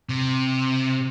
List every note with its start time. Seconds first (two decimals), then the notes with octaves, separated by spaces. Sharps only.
0.09 C3